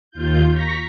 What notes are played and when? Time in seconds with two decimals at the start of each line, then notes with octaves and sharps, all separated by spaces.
0.11 D#2 F4 G6
0.52 A#5 C#6 A#6 B6